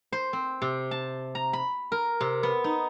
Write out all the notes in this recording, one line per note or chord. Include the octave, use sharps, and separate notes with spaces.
C5
C4
C3
A5
A#5
B5
A#4
C3
B3
D#4